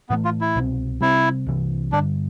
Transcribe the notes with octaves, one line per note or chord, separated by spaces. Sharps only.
A2 E3 A3 B3
F4
E4
C2 B2 G3 C4
C3 G3 C4 E4
C2 C3 E3
G2 D3 G3 D4